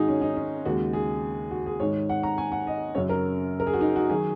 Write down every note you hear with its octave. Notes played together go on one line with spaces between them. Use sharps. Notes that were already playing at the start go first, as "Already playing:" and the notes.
Already playing: G#2 D#3 G#3 D#4 F#4 G#4
C#4
D#4
C#4
D#2 C#3 G#3 F#4
G#4
F#4
G#4
G#2 D#3 G#3 C#5
F#5
A#5
G#5
F#5
D#5
F#2 C#3 F#3 C#5
A#4
A#4
G#4
F#4
D#4
F#4
D#3 F#3 G#4